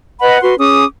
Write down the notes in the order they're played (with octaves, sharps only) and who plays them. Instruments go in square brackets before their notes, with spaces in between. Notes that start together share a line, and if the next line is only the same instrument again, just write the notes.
[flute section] B4 D#5 F#5 B5
F#4 B4 C6
C#4 G#4 D6 D#6